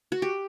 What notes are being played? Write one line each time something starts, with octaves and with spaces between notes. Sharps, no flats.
F#4
G4